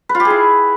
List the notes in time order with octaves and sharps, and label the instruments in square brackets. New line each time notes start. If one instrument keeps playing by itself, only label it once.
[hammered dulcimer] B4
F4
G4
G#4
E4